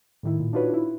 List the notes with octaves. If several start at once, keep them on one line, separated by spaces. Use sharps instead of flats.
A2 D#3 E4
A#2
D4 D#4 F4 F#4 B4 C#5
E4